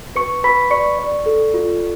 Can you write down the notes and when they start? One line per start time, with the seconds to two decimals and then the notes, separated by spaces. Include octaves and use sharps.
0.16 B4 C#6 C#7
0.44 B4 B5 B6
0.71 D5 C#6 C#7
0.99 D5
1.26 A4
1.54 F4